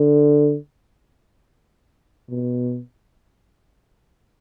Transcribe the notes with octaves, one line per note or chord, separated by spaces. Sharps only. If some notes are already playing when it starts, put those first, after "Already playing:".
Already playing: D3
B2